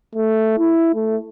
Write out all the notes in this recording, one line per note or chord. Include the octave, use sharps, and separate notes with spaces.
A3
E4
A3